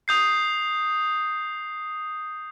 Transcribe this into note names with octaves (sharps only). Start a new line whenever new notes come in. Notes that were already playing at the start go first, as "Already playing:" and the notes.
D#6 G6 C7